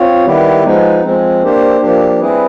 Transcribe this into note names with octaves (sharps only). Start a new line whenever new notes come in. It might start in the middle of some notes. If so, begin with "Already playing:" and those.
Already playing: C4 F4 C#5
D#3 G3 B3 E4 G4
F3 G#3 B3 D#4
F3 G#3 C4
A#3 D4 G4 C5
F3 A#3 D4 G4
G3 C4 E4 G#4 B4